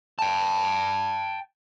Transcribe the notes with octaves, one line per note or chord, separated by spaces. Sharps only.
G5 A5